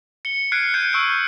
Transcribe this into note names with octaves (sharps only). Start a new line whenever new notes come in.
C#7 G7
F6 F#6 G#6 C7 D7 D#7
G6 G#6 C#7 D#7
C#6 E6 F6 G6 D7